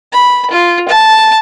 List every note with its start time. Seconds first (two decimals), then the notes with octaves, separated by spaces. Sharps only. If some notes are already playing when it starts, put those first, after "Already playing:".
0.13 B5
0.51 F4
0.89 A5